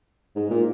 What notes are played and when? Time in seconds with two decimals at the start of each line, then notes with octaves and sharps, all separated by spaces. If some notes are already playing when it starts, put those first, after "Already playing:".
0.36 G#2
0.50 A#2